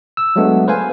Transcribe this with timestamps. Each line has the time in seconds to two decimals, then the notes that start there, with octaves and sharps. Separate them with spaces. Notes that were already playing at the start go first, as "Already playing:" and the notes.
0.17 E6
0.36 F#3 G#3 A3 B3 D4
0.68 B4 C5 F5 G#5